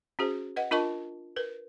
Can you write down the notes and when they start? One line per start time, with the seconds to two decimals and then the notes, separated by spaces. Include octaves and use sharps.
0.19 C#4 F#4 G#4 C5
0.56 B4 D#5 F#5
0.71 D4 F4 A#4 D#5 A5 C#6
1.36 A#4 B4